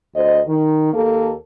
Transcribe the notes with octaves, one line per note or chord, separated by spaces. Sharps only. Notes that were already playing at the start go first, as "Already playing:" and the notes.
D2 C5 D#5
D#3
D#2 A#3 A4